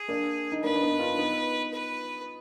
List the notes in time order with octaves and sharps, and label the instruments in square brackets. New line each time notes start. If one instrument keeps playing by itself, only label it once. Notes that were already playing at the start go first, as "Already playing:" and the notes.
Already playing: [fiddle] G#4
[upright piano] A#3 D4
D#4
[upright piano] A#3 D4 [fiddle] B4
[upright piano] D4
B3 D#4
D4 F4
B3 D#4
[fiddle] B4